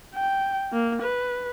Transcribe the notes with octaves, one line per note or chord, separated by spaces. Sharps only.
G5
A#3
B4